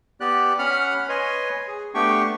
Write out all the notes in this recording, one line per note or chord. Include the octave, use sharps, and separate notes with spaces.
B3 G4 D5 F#6
C#4 F#5 B5 F6 F#6
B4 C#5 D#5 G#5 C6
G#4
A3 B3 D4 G4 G5 C#6